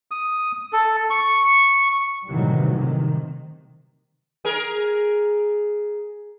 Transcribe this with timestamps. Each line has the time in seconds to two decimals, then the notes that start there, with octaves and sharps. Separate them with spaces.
0.11 D#6
0.73 A4
1.10 C#6
2.29 A2 C3 D#3 E3 F#3 G3
2.73 C3 D#3
4.45 G#4 A#4